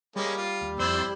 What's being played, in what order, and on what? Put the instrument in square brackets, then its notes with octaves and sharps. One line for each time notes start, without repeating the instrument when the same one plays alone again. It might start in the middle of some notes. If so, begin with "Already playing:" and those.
[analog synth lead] G3 [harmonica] G#3 A#3 C#4
[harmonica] F4
[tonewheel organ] D#2
[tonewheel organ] F2 D5 C6 [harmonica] E4 C5 E6